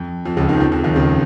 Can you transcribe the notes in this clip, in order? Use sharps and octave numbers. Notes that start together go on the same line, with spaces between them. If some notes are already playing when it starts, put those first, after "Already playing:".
Already playing: F2
F2 F3
C#2 C#3
D#2 D#3
F2 F3
F2 F3
D#2 D#3
C#2 C#3